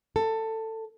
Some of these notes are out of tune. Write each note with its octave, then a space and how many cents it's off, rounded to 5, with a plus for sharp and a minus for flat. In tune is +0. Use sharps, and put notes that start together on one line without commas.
A4 +15